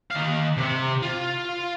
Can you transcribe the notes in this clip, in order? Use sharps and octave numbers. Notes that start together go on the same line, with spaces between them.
D#3 F5
C3 C4
F4